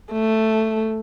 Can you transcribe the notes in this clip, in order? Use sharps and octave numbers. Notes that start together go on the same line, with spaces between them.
A3